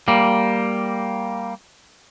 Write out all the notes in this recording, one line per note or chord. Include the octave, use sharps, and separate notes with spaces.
G3 A#3